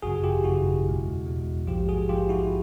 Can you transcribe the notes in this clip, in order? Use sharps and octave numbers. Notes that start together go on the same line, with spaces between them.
G#1 F#2 C#3 F#4 G#4
F4 G4
G#1 F#2 C#3 E4 F#4
E2 B2 G#3
E2 B2 G#3
A#1 G#2 F3 G#3 F4 G4
F#4 G#4
A#1 G#2 F3 G#3 F4 G4
E4 F#4